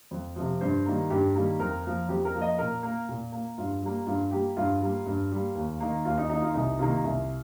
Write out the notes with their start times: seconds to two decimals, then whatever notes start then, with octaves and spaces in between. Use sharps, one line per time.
0.11 F2
0.36 C3 F3
0.61 G2 C5
0.86 D#3 G3 A#3
1.10 G2 G4
1.35 D#3 G3 A#3
1.60 F2 A#4
1.84 F3 A#3
2.09 F2 G4
2.25 A#4
2.34 F3 A#3
2.41 D#5
2.58 A#2 A#4
2.83 A#3
3.09 A#2
3.32 A#3
3.58 G2 F4
3.83 G3 A#3
4.06 G2 F4
4.31 G3 A#3 G4
4.57 G2 F4
4.81 G3 A#3
5.06 G2
5.31 G3 A#3
5.55 D#2
5.80 D#3 A#3
6.05 D#2 F4
6.18 D#4
6.30 D#3 A#3 D#4
6.42 F4
6.54 C2 D#4
6.79 C3 D#3 A#3 F4
7.04 C2